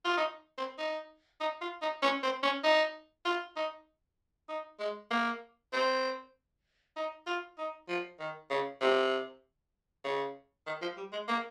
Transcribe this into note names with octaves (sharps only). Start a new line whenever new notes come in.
F4
D#4
C4
D#4
D#4
F4
D#4
C#4
C4
C#4
D#4
F4
D#4
D#4
G#3
A#3
C4
D#4
F4
D#4
F3
D#3
C#3
C3
C#3
D#3
F3
G3
G#3
A#3